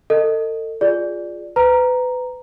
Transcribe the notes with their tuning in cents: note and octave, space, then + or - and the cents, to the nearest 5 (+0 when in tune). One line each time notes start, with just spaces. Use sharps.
A4 +35 D#5 -5
F4 +10 G#4 +0 D5 +0
B4 +30 A#5 +0